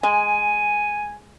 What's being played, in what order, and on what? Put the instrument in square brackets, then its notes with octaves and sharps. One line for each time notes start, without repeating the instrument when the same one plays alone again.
[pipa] G#3 [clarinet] G#5